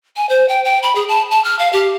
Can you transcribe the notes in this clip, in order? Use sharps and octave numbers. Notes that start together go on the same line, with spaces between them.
G#5
C5
G5
G5
B5
G#4
A5
A5
F6
F5
G4